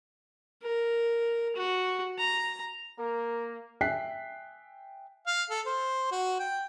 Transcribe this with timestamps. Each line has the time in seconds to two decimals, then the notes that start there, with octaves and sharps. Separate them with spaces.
0.63 A#4
1.56 F#4
2.18 A#5
2.99 A#3 A#4
3.81 E5 G5 G#5 F#6 B6 C7
5.27 F5
5.50 A4
5.66 C5
6.12 F#4
6.39 G5